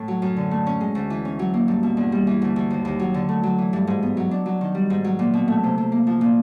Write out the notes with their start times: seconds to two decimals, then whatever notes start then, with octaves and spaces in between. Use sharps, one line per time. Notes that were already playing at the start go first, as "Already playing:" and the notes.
Already playing: A2
0.08 F#3
0.22 F#2
0.36 D3
0.51 A3
0.66 C#4
0.81 G#3
0.95 D2
1.10 E3
1.25 C#4
1.39 F#3
1.54 A#3
1.68 G2
1.83 B2
1.97 E2
2.12 G3
2.27 E3
2.42 D2
2.56 D2
2.70 D#2
2.85 D#2
2.99 F#3
3.14 D3
3.29 A3
3.43 F#3
3.58 E3
3.73 G2
3.87 G#2
4.03 B3
4.17 F#3
4.31 D4
4.46 F#3
4.61 D#3
4.75 G3
4.90 G#2
5.04 F#3
5.19 A#2
5.34 B2
5.48 A3
5.63 C3
5.78 C3
5.92 A#3
6.07 F3
6.21 A#2